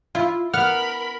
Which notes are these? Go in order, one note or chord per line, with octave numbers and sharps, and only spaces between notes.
E4 F4
B3 A#4 F#5 B5 F6